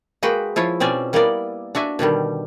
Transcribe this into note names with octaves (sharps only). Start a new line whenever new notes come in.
G#3 A#3 F#4 B4 G5
F3 E4 F4 C#5
B2 C4 C#4 D5 G#5
G3 A#3 B3 E4 A#4 D5
D4 F#4 E5 G#5
B2 D3 D#3 G3